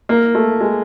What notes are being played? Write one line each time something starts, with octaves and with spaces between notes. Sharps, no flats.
A#3
A3
G#3